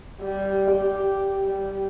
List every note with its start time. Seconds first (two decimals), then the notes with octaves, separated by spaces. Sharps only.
0.21 G3
0.71 G4
1.45 G3